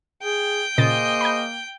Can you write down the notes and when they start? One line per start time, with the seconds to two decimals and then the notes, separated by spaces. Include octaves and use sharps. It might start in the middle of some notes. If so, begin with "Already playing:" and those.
0.23 G#4 G5
0.78 A#2 C#3 A#3 G#4 C5 D#5 A6
1.21 B5 G6